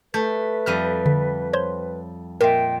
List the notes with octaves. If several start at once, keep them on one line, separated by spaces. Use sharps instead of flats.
A3 B4 G6
F2 G3 A#5 F6 D#7
D3
C5 C#5 C6
A#2 A#4 D#5 E5 G5